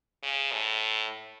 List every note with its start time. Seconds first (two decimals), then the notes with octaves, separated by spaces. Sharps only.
0.23 C#3
0.53 A2